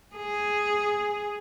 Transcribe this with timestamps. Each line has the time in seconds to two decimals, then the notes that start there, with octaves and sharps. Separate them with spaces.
0.16 G#4